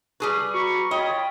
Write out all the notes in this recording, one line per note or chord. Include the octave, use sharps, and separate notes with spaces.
G3 G#4 B4 C#6
F#4 A#5 B5 C#6
F4 C#5 D#5 G5 B5